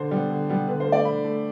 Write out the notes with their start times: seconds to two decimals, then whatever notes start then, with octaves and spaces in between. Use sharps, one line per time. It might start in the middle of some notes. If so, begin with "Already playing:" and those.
Already playing: D3 C5
0.11 G3 B3
0.30 D3
0.49 G3 B3
0.68 D3 B4
0.80 C5
0.87 A3
0.92 D5
1.05 D3 B5
1.24 A3